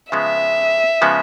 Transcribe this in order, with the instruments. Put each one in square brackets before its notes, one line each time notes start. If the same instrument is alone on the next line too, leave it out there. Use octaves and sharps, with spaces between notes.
[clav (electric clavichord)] C#3 F3 G#3 B3 [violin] E5
[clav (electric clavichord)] C#3 F3 G#3 B3